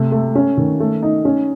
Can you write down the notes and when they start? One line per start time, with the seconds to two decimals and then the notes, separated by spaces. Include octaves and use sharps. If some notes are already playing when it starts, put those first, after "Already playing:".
Already playing: C3 A3
0.12 A3
0.35 C#4
0.57 D#3
0.80 A3
1.02 D#4
1.25 C#4